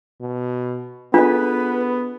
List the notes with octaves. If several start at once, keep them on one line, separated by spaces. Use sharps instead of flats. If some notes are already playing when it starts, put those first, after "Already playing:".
B2
B3 D4 F4 G#4 A4 B4 D#5